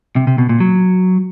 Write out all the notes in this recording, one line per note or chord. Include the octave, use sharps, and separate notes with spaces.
C3
C3
B2
A#2
F#3